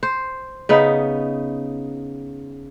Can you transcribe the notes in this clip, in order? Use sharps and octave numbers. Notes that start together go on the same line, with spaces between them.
C5
C#3 B3 D#4